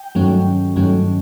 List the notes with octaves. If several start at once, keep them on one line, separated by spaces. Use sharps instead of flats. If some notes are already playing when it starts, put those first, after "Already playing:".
Already playing: G5
G2 D#3 F#3 A3 C#4
G2 D#3 F#3 A3 C#4